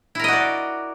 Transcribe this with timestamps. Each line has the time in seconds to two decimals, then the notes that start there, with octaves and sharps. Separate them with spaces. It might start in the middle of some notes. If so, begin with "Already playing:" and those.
0.15 E4
0.19 A#4
0.24 D#5
0.28 F#4
0.33 D5